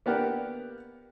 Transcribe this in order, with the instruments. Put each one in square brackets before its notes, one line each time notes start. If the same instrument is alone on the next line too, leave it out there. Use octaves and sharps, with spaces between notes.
[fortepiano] A#3 B3 D4 G4 A#4 F#5